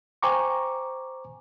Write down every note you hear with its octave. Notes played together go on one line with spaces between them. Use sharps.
C5 G5 G#5 A#5 C#6 D6